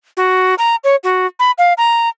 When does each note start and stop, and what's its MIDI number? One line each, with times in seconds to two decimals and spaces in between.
0.17 0.55 66
0.58 0.76 82
0.84 0.96 73
1.04 1.27 66
1.39 1.51 83
1.58 1.73 77
1.78 2.09 82